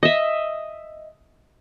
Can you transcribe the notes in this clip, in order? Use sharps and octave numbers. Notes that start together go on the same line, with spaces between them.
D#5 E5